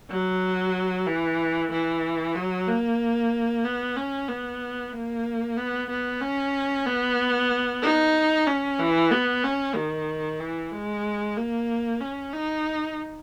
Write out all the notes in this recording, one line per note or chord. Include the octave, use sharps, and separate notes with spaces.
F#3
E3
E3
F#3
A#3
B3
C#4
B3
A#3
B3
B3
C#4
B3
D#4
C#4
E3
B3
C#4
D#3
E3
G#3
A#3
C#4
D#4